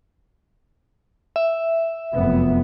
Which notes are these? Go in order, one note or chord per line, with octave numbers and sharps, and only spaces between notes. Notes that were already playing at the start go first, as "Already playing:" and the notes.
E5
F1 F#2 B3